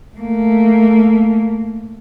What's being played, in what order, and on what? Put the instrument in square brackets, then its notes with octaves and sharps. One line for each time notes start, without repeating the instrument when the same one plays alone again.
[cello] A3 A#3